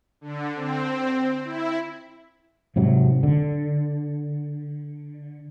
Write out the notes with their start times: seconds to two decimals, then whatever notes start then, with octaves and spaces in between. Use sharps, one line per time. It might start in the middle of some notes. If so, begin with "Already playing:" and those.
0.21 D3
0.55 C4
1.45 E4
2.76 G#2 C3 F#3
3.23 D3